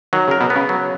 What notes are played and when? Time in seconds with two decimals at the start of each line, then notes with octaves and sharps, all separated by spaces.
0.13 D#3 F#3
0.28 C#3
0.31 A#4
0.40 B2
0.50 B3
0.55 C#3
0.69 F#3